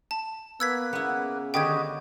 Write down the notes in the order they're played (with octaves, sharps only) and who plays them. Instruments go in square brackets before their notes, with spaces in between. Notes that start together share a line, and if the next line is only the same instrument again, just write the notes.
[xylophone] A5
[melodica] A#3 B4 [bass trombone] B3 [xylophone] E6 G#6 B6
[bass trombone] C#3 [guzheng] B3 E4
[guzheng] D3 D#3 B4 [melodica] F#4 G4 D#5 [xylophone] G5 G#6